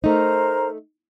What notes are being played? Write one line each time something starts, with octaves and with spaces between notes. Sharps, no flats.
A3 D#4 A#4 C5 A#5